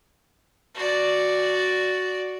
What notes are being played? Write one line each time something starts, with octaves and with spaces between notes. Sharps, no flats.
F#4 D5